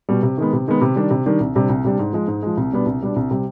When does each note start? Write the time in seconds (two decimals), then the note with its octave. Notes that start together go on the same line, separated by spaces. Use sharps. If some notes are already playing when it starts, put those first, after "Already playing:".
0.09 B2 G3
0.23 C3
0.38 D#3 G#3 B3
0.53 C3
0.68 D#3 G#3 B3
0.81 C3
0.96 D#3 G3 D4
1.10 C3
1.26 D#3 G3 D4
1.40 C2
1.55 C3 G3 D4
1.69 C2
1.84 C3 G3 D4
1.99 G#2
2.13 F3 G#3
2.28 G#2
2.43 F3 G#3
2.57 C2
2.72 B2 G3 B3 D4
2.86 C2
3.01 B2 G3 B3 D4
3.16 C2
3.31 C3 G3